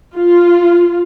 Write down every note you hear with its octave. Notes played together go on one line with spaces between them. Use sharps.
F4